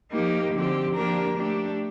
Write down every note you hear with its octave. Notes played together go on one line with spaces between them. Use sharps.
F3 A#3 D#4 G4
D3 F3 C4 G4
F3 A#3 D4 G4 A#4
A3 D4 G4